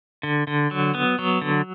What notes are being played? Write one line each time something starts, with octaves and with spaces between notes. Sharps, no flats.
D3
D3
F#3
B3
F#3
D3